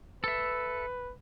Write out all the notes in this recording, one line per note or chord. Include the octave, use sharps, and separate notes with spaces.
A4 B4 E5